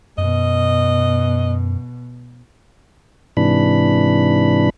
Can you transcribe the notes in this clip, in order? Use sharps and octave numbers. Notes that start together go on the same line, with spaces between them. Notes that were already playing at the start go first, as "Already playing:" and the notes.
F#2 B2 D#5
G#2 C3 E3 D4 B5